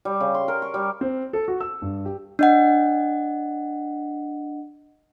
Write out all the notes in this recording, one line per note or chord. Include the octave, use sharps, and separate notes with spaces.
G3
C#3
C6
A#4
C#6
G3
C4
A4
F#4
E6
G2
G4
D4 D#5 F#5